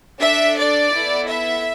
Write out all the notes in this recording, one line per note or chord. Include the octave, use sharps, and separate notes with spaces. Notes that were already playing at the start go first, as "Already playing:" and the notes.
D4 A4 E5
D5
B3 E4 A4
E5